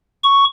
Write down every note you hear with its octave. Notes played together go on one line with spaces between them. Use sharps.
C#6